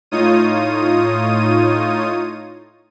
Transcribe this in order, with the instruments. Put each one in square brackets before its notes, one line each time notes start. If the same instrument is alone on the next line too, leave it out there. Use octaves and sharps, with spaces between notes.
[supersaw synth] A2 D#4 F4 C#5 D#6 D#7